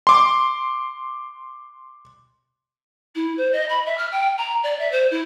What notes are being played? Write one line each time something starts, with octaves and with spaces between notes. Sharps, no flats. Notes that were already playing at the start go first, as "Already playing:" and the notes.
C6 D6
E4
C5
D#5
B5
E5
F6
G5
A#5
D5
E5
C5
E4